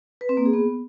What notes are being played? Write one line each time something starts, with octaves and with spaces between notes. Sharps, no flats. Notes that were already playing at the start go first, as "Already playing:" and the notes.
B4
C4
A#3
G#4
B3